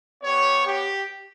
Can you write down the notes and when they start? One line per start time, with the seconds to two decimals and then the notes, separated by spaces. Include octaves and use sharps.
0.22 B3 G4 C#5
0.65 G4